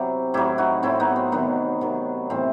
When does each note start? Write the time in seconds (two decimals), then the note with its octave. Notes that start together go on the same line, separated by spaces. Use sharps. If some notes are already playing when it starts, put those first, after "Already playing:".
Already playing: C3 F#3 E4 G4
0.34 A2 F#3 E4 G4
0.58 D#4 F#4
0.83 A2 F#3 C4 E4
1.00 B3 D#4
1.16 C4
1.32 C3 D#3 F#3 B3
1.81 C3 D#3 F#3
2.30 A2 E3 C4